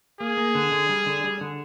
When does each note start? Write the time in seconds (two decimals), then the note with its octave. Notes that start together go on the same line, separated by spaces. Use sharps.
0.20 A#3 G#4
0.37 A#3
0.55 D3
0.72 D3
0.89 G3
1.06 D3
1.24 G3
1.41 D3